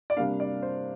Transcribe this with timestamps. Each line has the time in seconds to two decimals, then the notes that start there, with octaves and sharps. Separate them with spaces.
0.10 D5
0.17 C3 G3 A#3 D4 F5
0.40 D5
0.62 C5